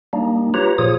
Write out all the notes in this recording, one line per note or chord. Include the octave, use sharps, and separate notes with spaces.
G3 A#3 D4 D#4
F4 G4 B4 C#5 A#5
A#2 F3 F4 G#4 C#5 D#6